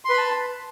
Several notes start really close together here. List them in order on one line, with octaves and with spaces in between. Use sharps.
C6 B4 B5 A5